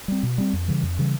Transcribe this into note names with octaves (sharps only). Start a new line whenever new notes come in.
G3 C4
B2
G3 C4
F2
C#3 E3 G3
F2
C#3 E3 G3